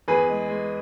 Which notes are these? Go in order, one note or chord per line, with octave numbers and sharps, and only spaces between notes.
E2 G#4 B4
G#3
G#3